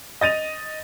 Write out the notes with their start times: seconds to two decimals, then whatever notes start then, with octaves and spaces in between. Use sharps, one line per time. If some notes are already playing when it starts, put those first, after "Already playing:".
0.21 D#5 A6 D#7 F7